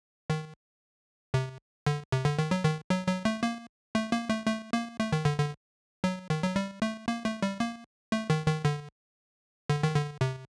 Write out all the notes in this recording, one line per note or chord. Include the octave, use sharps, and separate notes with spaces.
D#3
C3
D3
C3
D3
D#3
F#3
D#3
F#3
F#3
A3
A#3
A3
A#3
A3
A3
A#3
A3
D#3
D3
D3
F#3
D#3
F#3
G3
A3
A#3
A3
G3
A#3
A3
D#3
D#3
D3
D3
D#3
D3
C3